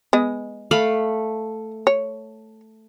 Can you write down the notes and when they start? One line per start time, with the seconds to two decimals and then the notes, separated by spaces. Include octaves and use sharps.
0.13 G#3 B3 D#5
0.71 A3 F5 B5
1.87 C#5